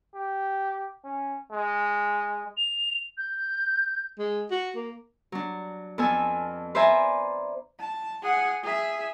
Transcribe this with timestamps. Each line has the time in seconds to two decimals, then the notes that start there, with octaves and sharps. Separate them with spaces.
0.14 G4
1.05 C#4
1.51 G#3
2.57 F7
3.17 G6
4.19 G#3
4.51 F#4
4.76 A#3
5.32 F#3 D4
5.98 F2 B3 A4 G#5 E6
6.75 B4 C5 D5 E5 G#5 A#5
7.79 A5
8.23 G#4 F#5
8.63 G#4 E5